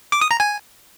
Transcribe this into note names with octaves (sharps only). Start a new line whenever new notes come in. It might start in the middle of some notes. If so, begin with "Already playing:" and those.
D6
D#6
A#5
G#5